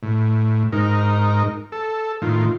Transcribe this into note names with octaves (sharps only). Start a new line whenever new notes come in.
A2
G#2 D#4 A#4
A4
A2 D#3 F4